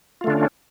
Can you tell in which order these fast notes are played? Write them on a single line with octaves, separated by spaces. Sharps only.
F4 A3 D3 D4 C#4